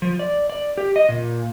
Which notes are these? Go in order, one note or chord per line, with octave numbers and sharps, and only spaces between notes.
F3
D5
D5
G4
D#5
A#2